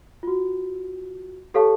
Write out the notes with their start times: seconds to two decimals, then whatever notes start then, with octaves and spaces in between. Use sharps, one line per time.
0.23 F4 F#4
1.54 G4 A4 C#5 F5 A5 C#6